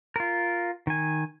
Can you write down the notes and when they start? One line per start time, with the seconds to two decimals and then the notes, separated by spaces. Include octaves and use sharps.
0.16 F4 A#4
0.87 D#3 G#5